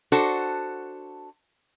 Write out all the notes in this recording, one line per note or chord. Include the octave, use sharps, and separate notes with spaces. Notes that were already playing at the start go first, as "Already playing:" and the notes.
D4 F#4 A4 C5